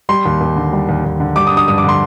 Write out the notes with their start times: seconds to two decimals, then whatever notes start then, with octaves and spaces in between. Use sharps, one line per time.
0.09 G3 C6
0.25 D#2
0.41 D#2
0.56 D3
0.73 G3
0.89 D#2
1.04 D#2
1.20 D3
1.36 G3 D6
1.47 D#6
1.52 D4
1.57 D#6
1.68 G2 D#6
1.78 D6
1.84 D3 C6